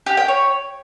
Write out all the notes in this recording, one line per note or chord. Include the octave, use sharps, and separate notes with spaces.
G4
G5
C#5